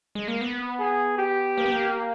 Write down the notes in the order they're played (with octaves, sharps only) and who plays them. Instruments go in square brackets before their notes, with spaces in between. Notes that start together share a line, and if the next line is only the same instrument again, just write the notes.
[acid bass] G#3
A#3
B3
[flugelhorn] G#4
G4
[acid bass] A#3
B3
A#3